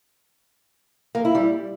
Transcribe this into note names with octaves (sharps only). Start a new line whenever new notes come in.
A#3
E4
G3